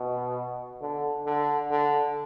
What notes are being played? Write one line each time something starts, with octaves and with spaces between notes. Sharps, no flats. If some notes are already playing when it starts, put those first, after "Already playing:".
Already playing: B2
D3
D3
D3